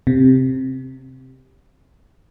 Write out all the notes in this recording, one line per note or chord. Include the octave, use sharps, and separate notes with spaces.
C3